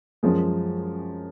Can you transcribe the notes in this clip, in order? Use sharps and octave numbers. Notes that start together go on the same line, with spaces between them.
F#2 F3 G#3